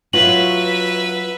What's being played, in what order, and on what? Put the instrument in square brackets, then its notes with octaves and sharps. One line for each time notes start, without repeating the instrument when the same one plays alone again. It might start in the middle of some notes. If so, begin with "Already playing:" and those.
[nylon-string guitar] F#3 F4 F#4 [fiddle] B4 E5 [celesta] F#7